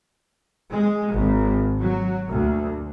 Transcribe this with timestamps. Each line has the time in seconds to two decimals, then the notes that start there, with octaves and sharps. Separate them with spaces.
0.71 G#3
1.14 G#1
1.81 F#3
2.28 D2